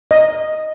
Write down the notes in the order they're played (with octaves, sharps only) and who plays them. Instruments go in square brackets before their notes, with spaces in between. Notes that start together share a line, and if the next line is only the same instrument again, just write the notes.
[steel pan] D#5